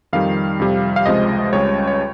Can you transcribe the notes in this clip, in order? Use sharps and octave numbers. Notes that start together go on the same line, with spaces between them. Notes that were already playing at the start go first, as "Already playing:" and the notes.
F2 D#3 G3 F5
F2 C3 G3
F5
C#2 C3 F3 G#3 D#5
C#2 C#3 G3 C#5
C#5